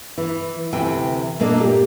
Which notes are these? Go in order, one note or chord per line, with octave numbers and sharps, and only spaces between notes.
E3
D2 C3 E3 G5 G#5
A#2 A3 A#3 D4 A4 D#5
A#2 G4